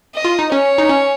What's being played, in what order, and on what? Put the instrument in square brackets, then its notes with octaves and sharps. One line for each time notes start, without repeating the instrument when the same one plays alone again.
[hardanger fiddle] D#5
[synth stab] F4
D#4
[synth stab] C#4 [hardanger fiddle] C#5
[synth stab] D#4
C#4